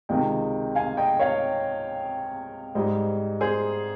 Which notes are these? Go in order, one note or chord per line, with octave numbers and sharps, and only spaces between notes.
C#2 C3 D#3 G#3 D#5 G5
F5 G#5
D#5 G5
C#5 F5
G#2 G3 C5 D#5
G#4 C5